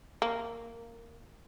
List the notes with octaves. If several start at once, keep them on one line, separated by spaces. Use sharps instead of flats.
A#3